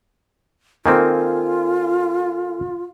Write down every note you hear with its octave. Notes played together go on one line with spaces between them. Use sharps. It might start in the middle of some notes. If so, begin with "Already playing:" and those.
D#3 A#3 C4 F4 A4 G#5